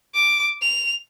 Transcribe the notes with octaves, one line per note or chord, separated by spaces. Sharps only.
D6
F7